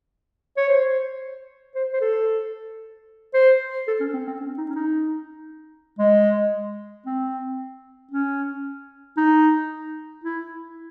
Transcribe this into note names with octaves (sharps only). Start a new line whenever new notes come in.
C#5
C5
C5
C5
A4
C5
A4
C#4
C4
C4
C#4
D#4
C#4
D#4
G#3
C4
C#4
D#4
E4